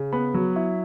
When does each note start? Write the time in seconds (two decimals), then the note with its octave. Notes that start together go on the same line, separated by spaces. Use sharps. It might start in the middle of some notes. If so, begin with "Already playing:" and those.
Already playing: C#3
0.13 B3 B5
0.34 F#3
0.56 E4